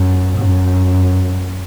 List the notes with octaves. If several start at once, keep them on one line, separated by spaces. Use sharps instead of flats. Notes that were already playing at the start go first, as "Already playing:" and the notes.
Already playing: F#2
F#2